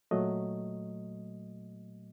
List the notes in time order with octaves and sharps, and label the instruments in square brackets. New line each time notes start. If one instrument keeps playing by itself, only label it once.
[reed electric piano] A#2 F#3 A3 D#5